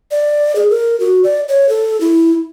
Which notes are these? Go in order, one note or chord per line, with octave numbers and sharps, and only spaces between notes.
D5
G#4
A#4
F#4
D5
C#5
A4
E4